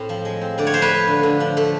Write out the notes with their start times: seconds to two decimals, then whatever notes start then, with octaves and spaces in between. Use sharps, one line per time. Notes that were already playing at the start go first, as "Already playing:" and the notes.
Already playing: A2 C4
0.09 F3
0.25 G#3
0.41 C4
0.58 D3 D5
0.67 C#5
0.74 F3 C5
0.82 B4 C#5
0.91 A3
1.07 D3
1.23 D3
1.40 F3
1.57 A3